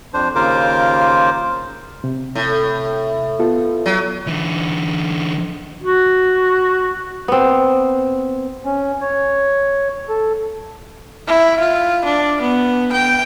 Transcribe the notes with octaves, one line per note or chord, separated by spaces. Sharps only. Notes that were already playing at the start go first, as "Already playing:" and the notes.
F2 D4 C5
D#2 C#3 F4 A#4 C5 D6
C3
A2
B3 F4 A4
F#3
D3 E3
F#4
B3 C4
C#4
C#5
A4
E4
F4
D4
B3
G5